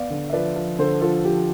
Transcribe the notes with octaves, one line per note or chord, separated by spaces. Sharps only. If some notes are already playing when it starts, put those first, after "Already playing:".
Already playing: B3 D5 F5
D3
E5
F3 B4 D5
F3
D3 A4 C5
F3 F4 A4
F3 G4